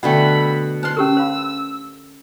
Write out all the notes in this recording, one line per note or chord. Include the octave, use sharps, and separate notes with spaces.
B2 D3 A3 F#5 G5 B5
B4 C5 A5 C6 F#6
C#4 G4 A#4 E6
C5 F5 B5